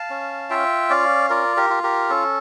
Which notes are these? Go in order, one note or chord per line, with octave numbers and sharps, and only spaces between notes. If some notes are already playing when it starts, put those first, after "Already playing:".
Already playing: F5 A5
C#4
F4 E5 G5
C#4 D5 F5
F4 A#4 D5
G4 A#4
F4
G4 A#4
C#4 A4